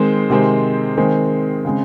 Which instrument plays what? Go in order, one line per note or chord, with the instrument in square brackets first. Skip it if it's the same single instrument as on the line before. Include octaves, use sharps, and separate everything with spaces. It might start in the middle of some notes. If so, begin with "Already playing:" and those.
Already playing: [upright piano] D#3 G#3 C4 C5
C3 D#3 G#3 C4
D#3 G#3 C4
C#3 G#3 C4